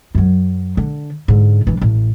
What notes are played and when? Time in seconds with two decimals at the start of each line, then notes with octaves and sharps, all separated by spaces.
0.15 F#2 F#3
0.77 D3
1.28 G#2 D3
1.67 E3 D4
1.81 A1